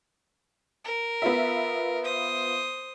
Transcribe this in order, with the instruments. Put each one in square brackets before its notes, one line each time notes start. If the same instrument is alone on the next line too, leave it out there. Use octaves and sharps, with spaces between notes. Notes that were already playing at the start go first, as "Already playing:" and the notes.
[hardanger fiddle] A#4
[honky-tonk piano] B3 F4 E5
[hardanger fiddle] C5 D#6